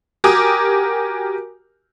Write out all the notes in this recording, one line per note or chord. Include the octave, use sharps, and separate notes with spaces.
F#4 G4 A#4 G#5 D6 D#6